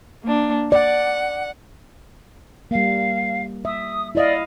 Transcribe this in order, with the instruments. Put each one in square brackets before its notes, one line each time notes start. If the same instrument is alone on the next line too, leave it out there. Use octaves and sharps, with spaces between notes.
[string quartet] A#3 D4
[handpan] D5 [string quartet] F#5
[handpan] G3 A#3 [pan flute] F5
[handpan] E5 [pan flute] D#6
[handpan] E4 D#5 F5 [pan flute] D5